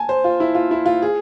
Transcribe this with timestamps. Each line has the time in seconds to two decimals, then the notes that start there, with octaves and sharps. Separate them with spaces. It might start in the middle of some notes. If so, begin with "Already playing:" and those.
Already playing: G#5 A5
0.09 C5
0.24 F4
0.40 E4
0.55 F4
0.71 E4
0.86 F4
1.02 G#4